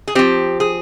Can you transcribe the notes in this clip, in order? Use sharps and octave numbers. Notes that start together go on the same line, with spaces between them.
G#4
F3 C4 G4
G#4